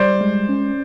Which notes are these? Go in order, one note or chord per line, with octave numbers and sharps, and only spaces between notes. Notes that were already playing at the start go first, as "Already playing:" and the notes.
Already playing: G3 C5 D5
G#3
C#4